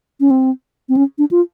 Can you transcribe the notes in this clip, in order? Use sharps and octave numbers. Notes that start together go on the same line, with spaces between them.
C#4
C4
C4
C#4
D4
F4